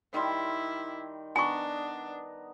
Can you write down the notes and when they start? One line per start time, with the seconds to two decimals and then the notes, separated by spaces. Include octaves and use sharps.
0.14 D#3 G3 E4 C6
1.36 B3 D4 G#5 A#5 C#6